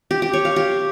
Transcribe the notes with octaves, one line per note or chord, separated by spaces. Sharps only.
G4
G4
C#5
F5
G4